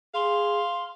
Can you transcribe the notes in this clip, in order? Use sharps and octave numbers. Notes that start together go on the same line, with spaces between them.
G#4 F5 C6